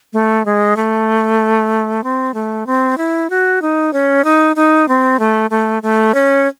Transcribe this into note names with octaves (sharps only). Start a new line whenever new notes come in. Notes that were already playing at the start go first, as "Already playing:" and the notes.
A3
G#3
A3
C4
A3
C4
E4
F#4
D#4
C#4
D#4
D#4
C4
A3
A3
A3
C#4